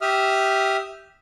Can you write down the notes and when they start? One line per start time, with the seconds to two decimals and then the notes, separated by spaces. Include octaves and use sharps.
0.01 G4 E5 D#6 F6